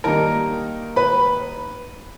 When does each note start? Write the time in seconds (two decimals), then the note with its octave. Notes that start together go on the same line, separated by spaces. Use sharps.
0.04 D#3 G3 A#3 D#4 A#4 A#5
0.96 B4 B5